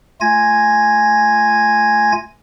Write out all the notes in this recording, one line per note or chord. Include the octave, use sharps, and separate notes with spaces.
A3 F4 G#5 G#6 A#6